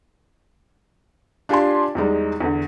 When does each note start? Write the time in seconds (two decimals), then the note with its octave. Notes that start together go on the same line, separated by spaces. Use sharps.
1.49 D4 F4 G4 G#5 A5 C6
1.95 E2 G3 G#3 D#4
2.40 E2 D3